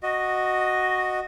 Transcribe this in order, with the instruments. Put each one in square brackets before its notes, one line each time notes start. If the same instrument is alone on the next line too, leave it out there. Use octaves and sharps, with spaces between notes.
[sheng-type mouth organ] F#4 D#5